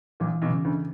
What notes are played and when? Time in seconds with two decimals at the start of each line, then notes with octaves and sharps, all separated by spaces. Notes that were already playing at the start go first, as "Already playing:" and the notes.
0.20 A#1 A#2 E3
0.42 B1 B2
0.50 C#3
0.64 D2 D3